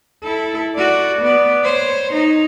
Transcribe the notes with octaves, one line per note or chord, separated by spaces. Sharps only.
E4 A4
F#4 D5
B3 D5
C5 C#5
D#4